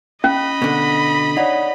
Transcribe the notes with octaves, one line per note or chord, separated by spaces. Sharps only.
C#4 D#5 B5
B2 D3
D#4 C#5 D5 F#5